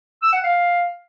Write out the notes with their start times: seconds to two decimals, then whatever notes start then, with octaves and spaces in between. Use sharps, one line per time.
0.22 E6
0.33 F#5
0.43 F5